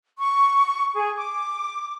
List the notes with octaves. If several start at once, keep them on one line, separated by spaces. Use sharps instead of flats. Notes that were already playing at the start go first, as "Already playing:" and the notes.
C#6
G#4
D6